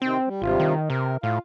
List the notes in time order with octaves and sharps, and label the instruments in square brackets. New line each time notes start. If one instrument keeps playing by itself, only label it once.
[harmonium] C3 D#3 G5 [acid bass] C4
[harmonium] G3
[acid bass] G#1 [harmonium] G2 C3 F4
[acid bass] D#3
[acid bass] C3 [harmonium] A#4
[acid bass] A2 [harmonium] F4 F5